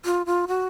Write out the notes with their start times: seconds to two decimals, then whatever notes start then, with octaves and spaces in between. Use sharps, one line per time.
0.05 F4
0.26 F4
0.48 F#4